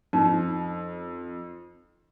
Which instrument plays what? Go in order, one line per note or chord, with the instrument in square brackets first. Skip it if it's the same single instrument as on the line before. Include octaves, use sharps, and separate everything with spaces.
[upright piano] F2 [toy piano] C#4 D#4